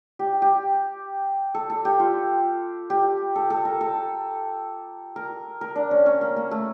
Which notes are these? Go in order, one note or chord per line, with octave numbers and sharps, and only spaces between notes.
G4
G4
A4
A4
G4
F4
G4
A4
A4
A#4
A4
A#4
A#4
D4
C#4
C#4
A#3
A#3
A3